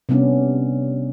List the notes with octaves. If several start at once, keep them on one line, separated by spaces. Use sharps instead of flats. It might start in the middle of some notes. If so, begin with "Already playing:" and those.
C3 G3 B3 C#4 D4